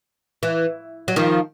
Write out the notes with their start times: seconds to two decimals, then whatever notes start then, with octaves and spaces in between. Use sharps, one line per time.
0.43 E3
1.08 F#3
1.16 D#3 F3